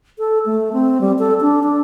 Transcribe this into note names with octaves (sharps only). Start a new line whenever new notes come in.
A4
A3
C4
G3
A4
D4
D4